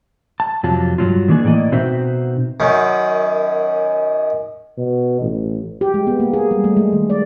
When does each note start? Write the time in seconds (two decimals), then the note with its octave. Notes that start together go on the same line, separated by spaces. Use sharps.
0.40 A5
0.63 F2 C3 F#3 F4 A5
0.98 G2 D#3 F#3 F4
1.28 D#3 E3 A#3 D4 G#4
1.44 A2 E3 A#3 D5 D#5
1.72 B2 C4 D#4 F#4 C5 E5
2.60 F#2 D#3
4.77 B2
5.21 A1
5.81 G4
5.94 G#3
6.07 B3
6.20 A#3
6.33 G#4
6.51 G3
6.64 A3
6.77 G#3
6.93 D#3
7.10 D5